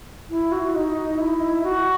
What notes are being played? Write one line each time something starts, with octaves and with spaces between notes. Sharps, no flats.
E4
F#4
D#4
E4
F#4